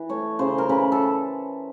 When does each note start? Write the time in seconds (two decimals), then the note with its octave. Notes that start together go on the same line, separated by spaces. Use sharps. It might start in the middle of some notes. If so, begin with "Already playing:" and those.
Already playing: E3
0.09 A3 C#5
0.39 C#3 C5
0.58 A#4
0.69 C#3 B4
0.92 A4